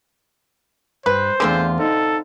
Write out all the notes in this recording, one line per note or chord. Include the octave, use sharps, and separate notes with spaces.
G2 B4 C5
E2 D3 A3 C4 F4 G#4
D#4 A4